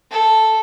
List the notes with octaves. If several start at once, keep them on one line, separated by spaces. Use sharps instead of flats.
A4